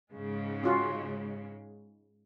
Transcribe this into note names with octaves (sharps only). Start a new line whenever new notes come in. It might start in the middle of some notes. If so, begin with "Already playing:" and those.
G#2 C#3 G#3
C#4 F4 F#4